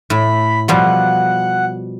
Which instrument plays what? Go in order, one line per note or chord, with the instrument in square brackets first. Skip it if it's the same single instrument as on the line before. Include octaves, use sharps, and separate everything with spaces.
[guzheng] A2 [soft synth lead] B5
[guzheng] B2 F3 G3 [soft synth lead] F#5